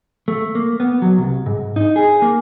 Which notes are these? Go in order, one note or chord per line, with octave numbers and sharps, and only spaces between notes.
A3
A#3
B3
F#3
C2
G#2
D#4
G#4
A#3